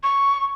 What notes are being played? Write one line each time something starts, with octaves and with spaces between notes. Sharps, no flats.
C#6